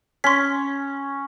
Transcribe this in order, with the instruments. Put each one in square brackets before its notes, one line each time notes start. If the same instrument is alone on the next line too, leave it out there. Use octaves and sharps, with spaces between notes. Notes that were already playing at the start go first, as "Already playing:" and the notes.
[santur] C#4 [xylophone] C6 B6